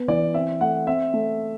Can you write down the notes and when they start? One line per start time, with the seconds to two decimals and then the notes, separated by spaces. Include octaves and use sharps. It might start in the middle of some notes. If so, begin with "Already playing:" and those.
Already playing: B3
0.08 E3 D5
0.34 C4 E5
0.61 A3 F#5
0.87 C4 E5
1.14 A3